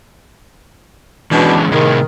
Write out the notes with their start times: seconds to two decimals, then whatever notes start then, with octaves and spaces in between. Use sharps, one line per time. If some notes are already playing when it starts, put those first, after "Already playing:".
1.31 B2 E3 G#3 C#4 D4
1.72 A2 C3 D#3 G#4